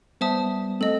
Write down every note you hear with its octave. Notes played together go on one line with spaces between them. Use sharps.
G3 B3 C5 E5 A5 D#6
A3 C4 A4 D#5